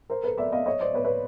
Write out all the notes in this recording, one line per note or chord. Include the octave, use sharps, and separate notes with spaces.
A#4 C5
A4 B4
D5 E5
D#5 F5
C#5 D#5
C5 D5
B4 C#5
B4 C#5